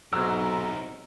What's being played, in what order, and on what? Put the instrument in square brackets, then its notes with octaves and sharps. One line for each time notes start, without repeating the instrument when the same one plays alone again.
[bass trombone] B1 [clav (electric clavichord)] G#2 F#3 [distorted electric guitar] C3 A#4 [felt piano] E6